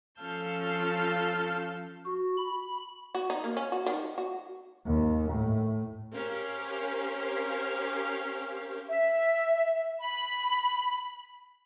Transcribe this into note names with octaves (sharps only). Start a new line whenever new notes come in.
F3 C#4 A4 F5 A5 G6
F#4
B5
F#4
D#4
A#3
C#4
F#4
D#3
F#4
D#2
A2
C#4 G4 A#4 C5 F5
E5
B5